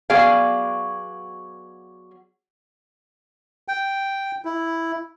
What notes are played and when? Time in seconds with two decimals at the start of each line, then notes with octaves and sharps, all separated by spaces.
0.10 F#3 B3 F#4 G#4 D5 F5
3.68 G5
4.45 E4